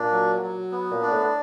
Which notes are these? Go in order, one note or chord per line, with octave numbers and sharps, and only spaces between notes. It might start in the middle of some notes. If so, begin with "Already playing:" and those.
Already playing: A#2 D4
F#3
F#3
B3
A#2
D4
A2